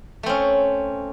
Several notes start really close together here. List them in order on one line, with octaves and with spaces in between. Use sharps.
A3 C4 C#4